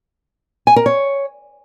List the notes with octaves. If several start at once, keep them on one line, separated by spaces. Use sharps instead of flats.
G#5
A#4
C#5